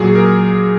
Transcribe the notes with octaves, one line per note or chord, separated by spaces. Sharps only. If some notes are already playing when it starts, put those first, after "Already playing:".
Already playing: A#2 F#3 G#4
A#4